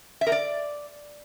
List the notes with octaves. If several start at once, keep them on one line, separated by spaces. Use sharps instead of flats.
E5
A#4
D5